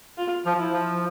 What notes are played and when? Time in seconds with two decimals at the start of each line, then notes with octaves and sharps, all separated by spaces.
0.18 F4
0.45 F3
0.59 E4
0.72 F3